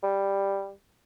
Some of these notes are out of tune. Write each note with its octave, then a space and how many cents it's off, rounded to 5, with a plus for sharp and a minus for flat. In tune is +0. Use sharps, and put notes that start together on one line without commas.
G3 +5